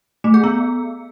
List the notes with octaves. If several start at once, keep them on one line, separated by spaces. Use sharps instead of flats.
A3
G#4
B3